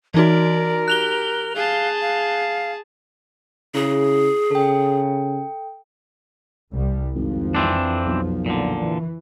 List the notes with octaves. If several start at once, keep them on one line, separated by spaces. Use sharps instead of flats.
E3 D#4 F#4 A#4 D5
G4 F#6 F7 G7
G#4 F5 A5
F5
C#3 E4 G#4
C#3 A4 G5
C2 G3
G#1 F2 F3
E3 C4 D4
B1
A#2 D3
E3